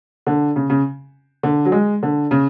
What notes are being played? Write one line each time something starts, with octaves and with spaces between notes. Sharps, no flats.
D3
C#3
C#3
D3
F#3
G#3
D3
C#3